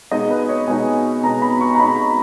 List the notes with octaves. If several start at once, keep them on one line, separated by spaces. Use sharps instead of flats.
B2 G#3 D#4 D#5
B4
C#5
B2 G#3 D#4 G#5
B2 G#3 D#4 A#5
B5
C#6
A#5
B2 G#3 D#4 B5